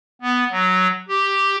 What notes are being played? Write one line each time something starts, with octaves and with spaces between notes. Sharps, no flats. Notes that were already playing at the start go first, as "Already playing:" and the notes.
B3
F#3
G4